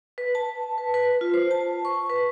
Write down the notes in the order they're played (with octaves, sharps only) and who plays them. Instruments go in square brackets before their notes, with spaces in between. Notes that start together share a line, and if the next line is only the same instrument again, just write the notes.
[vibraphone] B4
A5
B4
B4
F4
C5
A5
C#6
B4